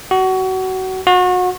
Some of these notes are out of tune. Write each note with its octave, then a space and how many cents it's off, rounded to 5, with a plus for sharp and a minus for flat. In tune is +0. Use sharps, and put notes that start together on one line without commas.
F#4 +25
F#4 -30